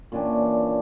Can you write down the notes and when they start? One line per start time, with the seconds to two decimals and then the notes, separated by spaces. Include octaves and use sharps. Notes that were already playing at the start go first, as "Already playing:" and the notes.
0.12 A#2 E3 C#4 D4